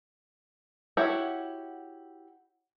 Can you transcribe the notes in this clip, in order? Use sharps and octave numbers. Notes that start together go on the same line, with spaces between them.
E4 F#4 G4 C#5